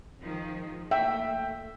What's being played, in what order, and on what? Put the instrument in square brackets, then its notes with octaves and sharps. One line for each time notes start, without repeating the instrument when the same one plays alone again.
[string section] D#3 F3 G#3
[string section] A#2 A3 [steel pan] E5 [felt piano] G5